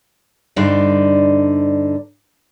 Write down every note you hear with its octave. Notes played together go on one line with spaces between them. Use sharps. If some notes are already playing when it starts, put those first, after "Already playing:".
G2 D3 D#4 C5 D5